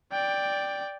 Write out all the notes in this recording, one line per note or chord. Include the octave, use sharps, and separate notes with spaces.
D5 G5